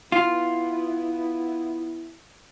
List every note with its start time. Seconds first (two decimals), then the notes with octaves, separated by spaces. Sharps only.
0.12 B3 E4 F4